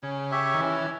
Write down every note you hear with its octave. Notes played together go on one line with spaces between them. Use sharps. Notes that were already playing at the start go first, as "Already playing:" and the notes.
C#3 C#4
G4 C#5 E5
D#3
E3 C#4